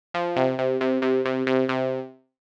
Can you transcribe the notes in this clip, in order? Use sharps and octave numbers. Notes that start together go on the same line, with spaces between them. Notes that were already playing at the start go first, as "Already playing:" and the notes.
F3
C3
C3
C3
C3
C3
C3
C3